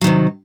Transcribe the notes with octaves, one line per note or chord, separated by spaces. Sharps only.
C3 D#3 F#3